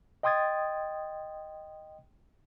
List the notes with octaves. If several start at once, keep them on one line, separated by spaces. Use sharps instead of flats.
D#5 G5 C6 D#6 G#6 A6